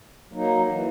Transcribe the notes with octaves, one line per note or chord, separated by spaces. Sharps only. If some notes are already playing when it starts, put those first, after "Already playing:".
F#3 A#3 D#4
E3